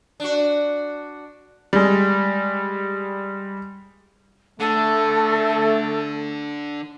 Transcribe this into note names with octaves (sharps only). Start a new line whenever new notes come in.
D4 F#4
G3 G#3
D3 A3 A4